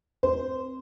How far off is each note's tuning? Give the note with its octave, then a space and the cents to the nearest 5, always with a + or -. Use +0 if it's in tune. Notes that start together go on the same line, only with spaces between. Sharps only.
C4 +0 C5 -10